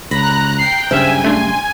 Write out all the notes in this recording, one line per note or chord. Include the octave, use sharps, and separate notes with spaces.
C#2 A#5 B5 F#6 A#6
G5 C7
F#1 G2 C#3 C5 E5 G#5 F6
A3 D4 C6